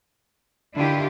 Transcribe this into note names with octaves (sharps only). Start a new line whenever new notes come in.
D3 D#3 E4 F4 G4